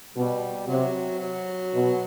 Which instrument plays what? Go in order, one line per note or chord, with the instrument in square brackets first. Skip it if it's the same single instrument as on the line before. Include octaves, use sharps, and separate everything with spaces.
[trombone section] B2 [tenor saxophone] G3
[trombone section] C3 [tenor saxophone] F#3
[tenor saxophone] F#3
[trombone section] B2